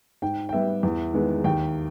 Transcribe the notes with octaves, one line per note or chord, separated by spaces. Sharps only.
G#2 G5
G5
G3 B3 E5
E2
D#3 G#3 B3
D#2 G5